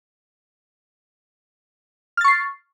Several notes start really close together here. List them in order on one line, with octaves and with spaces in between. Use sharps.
F6 A6 C#6 C7